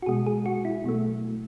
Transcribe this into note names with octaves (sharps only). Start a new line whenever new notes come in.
F#4
B2 G#3 G#4
G#4
F#4
E4
B2 F#3 A3